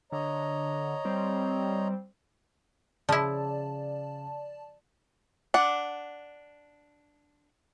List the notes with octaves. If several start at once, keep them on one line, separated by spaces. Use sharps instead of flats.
D3 C#5 D#5 A#5
G3 C4
C#3 F3 E4 D5 A5
D4 F#5